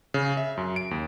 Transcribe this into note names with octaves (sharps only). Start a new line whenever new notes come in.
C#3
E5
F#2
D7
D#2